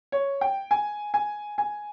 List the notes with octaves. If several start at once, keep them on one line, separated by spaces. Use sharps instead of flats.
C#5
G5
G#5
G#5
G#5